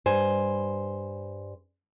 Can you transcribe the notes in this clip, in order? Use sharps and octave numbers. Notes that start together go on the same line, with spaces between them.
G2 C5 G#5